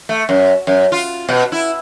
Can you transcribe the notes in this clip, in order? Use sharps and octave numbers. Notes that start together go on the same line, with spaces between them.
A3
F#2
F#2
F4
B2
E4